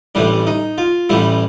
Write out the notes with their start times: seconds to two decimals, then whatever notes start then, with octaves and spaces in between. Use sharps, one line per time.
0.15 A1 A2 E3 G3 D4
0.47 D#4
0.78 F4
1.09 A1 A2 E3 G3 E4